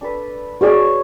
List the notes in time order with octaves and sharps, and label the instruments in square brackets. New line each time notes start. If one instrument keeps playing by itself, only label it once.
[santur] D4 A4 B4
[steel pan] F#4 G#4 D5 [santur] C#5 G#5